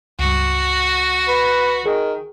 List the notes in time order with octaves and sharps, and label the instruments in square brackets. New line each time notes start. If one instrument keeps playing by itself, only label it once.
[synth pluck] C#2 G2 [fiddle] F#4
[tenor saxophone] B4
[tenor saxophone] D#3 [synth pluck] G#4